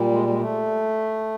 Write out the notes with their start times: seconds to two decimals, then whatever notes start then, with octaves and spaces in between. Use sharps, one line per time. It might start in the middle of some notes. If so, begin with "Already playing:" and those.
Already playing: A#2 G3
0.11 G#3
0.27 G#3
0.40 A3